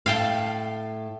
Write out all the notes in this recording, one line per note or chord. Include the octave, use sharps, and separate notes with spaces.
A2 F5 G5 A5